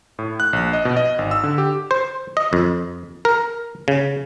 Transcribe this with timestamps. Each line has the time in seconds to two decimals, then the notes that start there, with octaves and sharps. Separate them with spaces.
0.19 A2
0.40 F#6
0.53 A#1
0.73 D#5
0.85 B2
0.97 D#5
1.19 G#1
1.31 E6
1.44 D3
1.58 G4
1.91 C5
2.37 D#5
2.53 F2
3.25 A#4
3.88 C#3